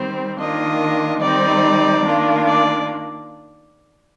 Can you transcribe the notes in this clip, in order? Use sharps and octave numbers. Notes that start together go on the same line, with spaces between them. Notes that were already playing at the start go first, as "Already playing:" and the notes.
Already playing: D#3 G3 C4 C5
D#3 A#3 D4 F4 D#5
D#3 G3 C4 D#4 D5
D#3 A#3 D4 F4
D5